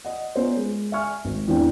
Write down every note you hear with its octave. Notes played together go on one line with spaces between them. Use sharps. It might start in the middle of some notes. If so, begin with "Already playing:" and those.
D#5 F#5
A#3 B3 C#4 F4 C5 C#5
G#3
E5 G#5 C#6 F6
G#1
E2 E3 C4 D4 G5